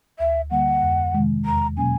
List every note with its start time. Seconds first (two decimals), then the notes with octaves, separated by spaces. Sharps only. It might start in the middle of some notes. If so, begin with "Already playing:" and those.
0.19 D2 E5
0.51 D3 G3 A#3 F#5
0.82 F2
1.14 C3 D#3 G#3
1.45 E2 A#5
1.77 B2 F#3 A#3 C#4 G#5